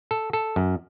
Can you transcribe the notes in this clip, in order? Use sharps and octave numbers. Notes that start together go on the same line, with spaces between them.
A4
A4
F#2